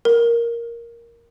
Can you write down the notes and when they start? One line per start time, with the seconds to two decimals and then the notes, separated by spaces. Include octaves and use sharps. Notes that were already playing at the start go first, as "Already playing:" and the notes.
0.05 A#4